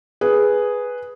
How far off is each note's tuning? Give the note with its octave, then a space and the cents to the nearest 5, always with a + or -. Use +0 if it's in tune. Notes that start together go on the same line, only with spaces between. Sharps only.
G#4 +0 B4 +0